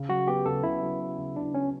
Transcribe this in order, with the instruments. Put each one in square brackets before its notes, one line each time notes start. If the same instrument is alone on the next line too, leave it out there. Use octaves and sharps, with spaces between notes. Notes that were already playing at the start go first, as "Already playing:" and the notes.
Already playing: [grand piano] C#3
[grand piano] F#3 [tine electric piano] F#4
[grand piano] B3 [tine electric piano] G4
[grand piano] C#3 [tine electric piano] A4
[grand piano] C#3 [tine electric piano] E4
[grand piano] F#3
B3
C#3
[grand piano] C#3 [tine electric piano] D4
[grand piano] F#3 [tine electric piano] C#4